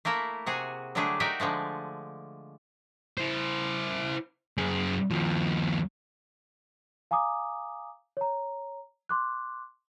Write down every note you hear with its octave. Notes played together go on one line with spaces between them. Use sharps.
A3 A#3 E4 A#4 E5
C3 F#4 G#4
D3 F#3 G3 A3 D4 G#4
D#4 F#4 G4 A#4 D5 E5
D3 F3 G#3 A3
E4 C5
F#2 G#4
D#2 F3
F5 G#5 A#5 D6 D#6
C#5 A#5
C6 D6 F#6